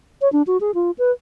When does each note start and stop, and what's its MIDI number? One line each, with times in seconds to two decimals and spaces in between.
0.21 0.31 73
0.32 0.43 62
0.47 0.57 66
0.61 0.71 68
0.75 0.91 65
0.98 1.11 71